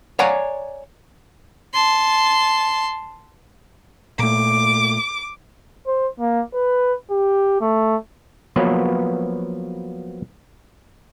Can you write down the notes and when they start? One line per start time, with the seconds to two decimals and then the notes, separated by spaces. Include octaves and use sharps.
0.19 C#5 D5 F5 F#5 G#5 A#5
1.73 A5 C6
4.19 A#2 A3 D6
5.87 C5
6.20 A#3
6.54 B4
7.10 G4
7.61 A3
8.56 F3 F#3 A#3 B3 B4 C#5